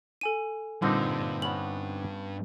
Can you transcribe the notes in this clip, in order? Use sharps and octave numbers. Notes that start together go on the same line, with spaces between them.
A4 G#5 D#7
G2 A#2 D3 C4 D#4
B3 C#4 F#7